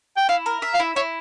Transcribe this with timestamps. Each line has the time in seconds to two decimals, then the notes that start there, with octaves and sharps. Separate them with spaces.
0.17 G5
0.29 E4 F5
0.46 A#4
0.62 E5
0.74 F5
0.80 E4
0.96 E4 C#5